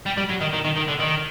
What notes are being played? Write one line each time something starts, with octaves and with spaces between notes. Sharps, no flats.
G3
G3
F#3
D#3
D#3
D#3
D#3
D3
D#3